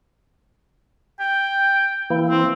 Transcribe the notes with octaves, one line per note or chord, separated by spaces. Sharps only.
G5
E3 A#3 E4
C4